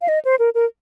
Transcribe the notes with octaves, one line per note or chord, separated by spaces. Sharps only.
F5
D#5
C5
A#4
A#4